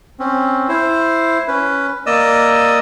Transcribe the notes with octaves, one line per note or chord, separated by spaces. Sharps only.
C4 C#4
E4 C5
C#4 B4
A#3 D5 D#5 D#6 E6